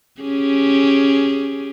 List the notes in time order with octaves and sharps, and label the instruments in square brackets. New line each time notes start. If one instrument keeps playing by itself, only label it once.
[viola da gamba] C#4 G4 G#4